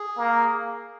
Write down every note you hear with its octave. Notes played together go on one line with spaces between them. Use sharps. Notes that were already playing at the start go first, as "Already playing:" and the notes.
Already playing: G#4
A#3